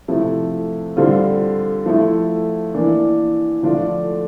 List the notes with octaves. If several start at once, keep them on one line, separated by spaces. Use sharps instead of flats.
C3 F3 A3 E4
D3 G3 C4 F4
F3 A3 E4
E3 A#3 D4
D3 F3 A3 D4 F4